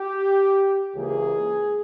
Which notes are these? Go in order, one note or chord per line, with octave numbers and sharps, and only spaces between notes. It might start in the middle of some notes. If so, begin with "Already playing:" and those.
Already playing: G4
C#2 C#3 E3 A#3 G#4